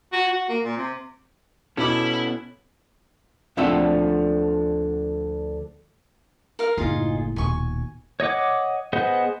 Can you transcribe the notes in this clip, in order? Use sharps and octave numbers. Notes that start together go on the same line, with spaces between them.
F#4
F#4
A#3
A#2
C3
B2 B3 C#4 E4 A4 D6
D2 D3 F3 A3 C4 E5
A#4 F5
F#1 A2 D#4 F4 G#4
D#1 B2 G#5 C#6
C#5 D#5 F#5 D6
B3 G#4 C5 D#5 F#5